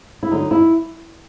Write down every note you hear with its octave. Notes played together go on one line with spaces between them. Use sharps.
E4
D2 D3 F#3 D#4
E4